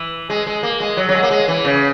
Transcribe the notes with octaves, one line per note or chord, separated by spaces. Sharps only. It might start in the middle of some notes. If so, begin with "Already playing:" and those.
Already playing: E3
G#3
G#3
A#3
G#3
F#3
F#3
G#3
A#3
G#3
E3
C#3